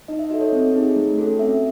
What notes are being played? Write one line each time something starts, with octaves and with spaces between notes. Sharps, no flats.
D#4 D#5
E5
F#4 A4 D#5
C#5
C4
D#4 G#4
A3
C#4 F#4 A4
C4 E5